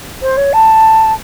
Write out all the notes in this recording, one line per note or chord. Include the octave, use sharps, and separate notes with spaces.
C5
C#5
A5